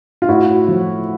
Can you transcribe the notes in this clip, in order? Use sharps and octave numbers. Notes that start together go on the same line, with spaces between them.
F4
A2 E4 F#4
F3